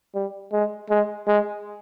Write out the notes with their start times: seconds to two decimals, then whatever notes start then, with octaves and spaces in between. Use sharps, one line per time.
0.15 G3
0.52 G#3
0.90 G#3
1.27 G#3